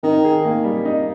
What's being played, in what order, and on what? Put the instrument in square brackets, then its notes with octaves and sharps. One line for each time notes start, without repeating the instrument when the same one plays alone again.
[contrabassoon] D#3 [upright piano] D#4
[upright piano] G#4
A#3
G3
D#4